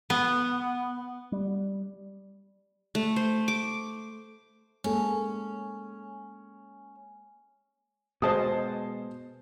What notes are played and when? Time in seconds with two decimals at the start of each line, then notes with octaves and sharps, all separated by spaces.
0.10 B3
1.32 G3
2.95 A3
3.16 C5
3.48 D6
4.84 G#3 A#3 C#4 A4
8.22 B2 G#3 C5 A5 D#6